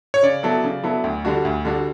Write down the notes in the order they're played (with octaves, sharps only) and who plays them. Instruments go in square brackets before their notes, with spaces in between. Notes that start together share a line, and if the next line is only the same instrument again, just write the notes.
[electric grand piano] C#5
[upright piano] C#3 [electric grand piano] D5
[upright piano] F#3 B3 E4 A4
C#3
F#3 B3 E4 A4
D2
D3 G3 D4 F#4
D2
D3 G3 D4 F#4